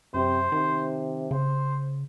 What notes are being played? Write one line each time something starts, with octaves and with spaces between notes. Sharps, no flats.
F#2 C3 C5
C3 D#3
C#3 C5